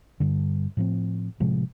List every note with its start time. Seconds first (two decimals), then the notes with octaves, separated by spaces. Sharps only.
0.20 G2 D3
0.77 A2 F3 C4
1.40 A2 C3 F3 G#3